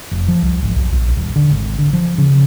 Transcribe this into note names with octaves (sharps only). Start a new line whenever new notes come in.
F1
F3
C2
G#1
B1
A#1
D#1
D3
G#1
D3
F3
C#3